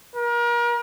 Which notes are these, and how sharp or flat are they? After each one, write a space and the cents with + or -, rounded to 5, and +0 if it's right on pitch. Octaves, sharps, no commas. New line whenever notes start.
A#4 +35